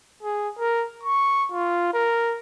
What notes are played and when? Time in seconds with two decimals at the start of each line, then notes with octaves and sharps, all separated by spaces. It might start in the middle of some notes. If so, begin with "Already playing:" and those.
0.23 G#4
0.58 A#4
1.04 C#6
1.52 F4
1.94 A#4